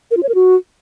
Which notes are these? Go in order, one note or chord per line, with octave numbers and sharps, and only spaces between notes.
A#4
F4
C#5
A#4
F#4